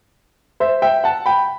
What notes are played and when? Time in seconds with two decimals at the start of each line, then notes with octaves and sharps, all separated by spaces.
0.60 C5 E5
0.82 E5 G5
1.04 F#5 A5
1.26 G5 B5